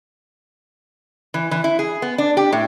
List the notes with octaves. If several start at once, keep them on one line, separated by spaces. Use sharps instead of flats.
E3
E3
E4
G#4
B3
D4
G4
A2